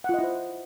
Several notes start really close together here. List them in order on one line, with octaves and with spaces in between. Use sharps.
F#5 F4 D#5 E4 C5